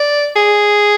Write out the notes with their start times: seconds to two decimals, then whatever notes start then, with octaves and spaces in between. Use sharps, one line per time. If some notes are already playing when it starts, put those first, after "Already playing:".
Already playing: D5
0.36 G#4